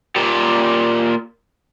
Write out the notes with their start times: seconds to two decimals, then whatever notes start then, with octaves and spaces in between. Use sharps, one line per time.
0.16 A#2 G4